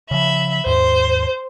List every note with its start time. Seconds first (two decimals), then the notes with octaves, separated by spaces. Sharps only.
0.11 C#3 F3 E5 B5
0.66 D#2 G#2 C5